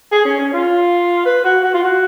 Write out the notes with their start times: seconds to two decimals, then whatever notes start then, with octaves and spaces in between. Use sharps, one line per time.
0.12 G#4
0.25 C#4
0.39 C#4
0.53 F4
1.26 B4
1.44 F#4
1.64 F#4
1.74 F4
1.84 F#4